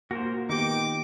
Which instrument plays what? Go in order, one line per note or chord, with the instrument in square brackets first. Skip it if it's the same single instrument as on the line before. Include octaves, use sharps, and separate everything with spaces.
[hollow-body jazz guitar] A#2 A#3 [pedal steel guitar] F#4 A#4 C5
[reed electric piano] D#3 B3 G4 [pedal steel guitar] D#4 G5 [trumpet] D6